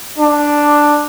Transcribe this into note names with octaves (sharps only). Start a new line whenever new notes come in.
D4